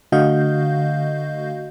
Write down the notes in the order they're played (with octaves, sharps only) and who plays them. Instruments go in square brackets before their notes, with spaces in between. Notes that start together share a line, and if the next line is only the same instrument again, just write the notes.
[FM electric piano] D3 A3 F#4 D#5 F5 G6